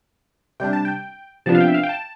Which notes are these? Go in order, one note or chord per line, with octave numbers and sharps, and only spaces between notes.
C3 G3 D4 G5
A5
G5
C3 F3 B3 D4 A5
F5
G5
E5
F5
G5
A5